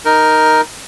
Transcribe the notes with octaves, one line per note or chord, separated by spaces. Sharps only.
D#4 A#4